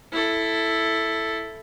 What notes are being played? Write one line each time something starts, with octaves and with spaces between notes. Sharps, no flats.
E4 A4